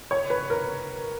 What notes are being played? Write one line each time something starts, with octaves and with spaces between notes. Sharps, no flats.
C#5
B4
A#4